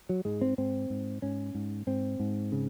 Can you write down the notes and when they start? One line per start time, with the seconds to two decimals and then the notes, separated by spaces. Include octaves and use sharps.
0.09 F#3
0.25 G#2 G#3
0.41 C4
0.58 G#2 C4
0.90 G#2
1.22 G#2 C#4
1.55 G#2
1.87 G#2 C4
2.20 G#2
2.52 C#3